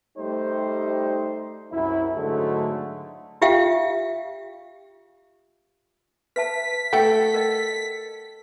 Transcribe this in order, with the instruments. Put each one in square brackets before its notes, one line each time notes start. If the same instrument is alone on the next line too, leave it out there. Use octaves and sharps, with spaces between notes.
[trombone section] G3 A3 D#4 G4 C5
C2 F#2 E4
G#2 D3 F#3 G#3 A3
[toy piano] F4 G4 E5 F5 G5
[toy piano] B4 E5 A5 [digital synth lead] B6
[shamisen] A3 F#5 G5 [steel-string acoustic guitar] A4
[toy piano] A#4 D#5